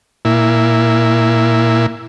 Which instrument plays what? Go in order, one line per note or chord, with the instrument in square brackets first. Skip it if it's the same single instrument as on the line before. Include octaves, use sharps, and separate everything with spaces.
[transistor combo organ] A#2 E4